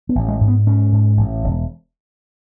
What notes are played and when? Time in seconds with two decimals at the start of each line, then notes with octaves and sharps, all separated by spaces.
0.09 B3
0.15 A1
0.28 G#3
0.41 G#2
0.48 B3
0.66 G#2 C#4
0.92 G#2
1.17 A1
1.44 E1